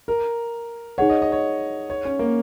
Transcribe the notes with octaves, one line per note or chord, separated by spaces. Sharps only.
A#4
D#4 G#4 C#5 F#5
D#5
D#5
C#5
C#5
C#4
A#3